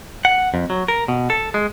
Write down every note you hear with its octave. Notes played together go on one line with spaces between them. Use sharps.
F#5
F2
F#3
A#4
B2
A4
G#3